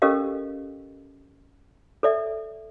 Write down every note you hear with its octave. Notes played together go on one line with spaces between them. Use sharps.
C#4 G4 A4 A#4 D#5 F5
A4 D5 E5